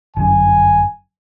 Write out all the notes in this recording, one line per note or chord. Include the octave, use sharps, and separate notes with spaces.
G1 F#2 G#5